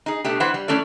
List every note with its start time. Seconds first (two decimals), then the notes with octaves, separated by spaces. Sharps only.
0.06 D#4 G#4
0.24 B2 A3 D4 G4
0.40 E3 B4 C5 F#5
0.54 G3
0.68 E3 A3 C#4 A4 D5